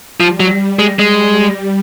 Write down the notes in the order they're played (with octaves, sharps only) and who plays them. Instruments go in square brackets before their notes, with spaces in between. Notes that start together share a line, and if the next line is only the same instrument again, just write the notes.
[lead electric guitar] F3 [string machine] G3
[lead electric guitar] F#3
G#3
[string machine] G3 [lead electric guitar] G#3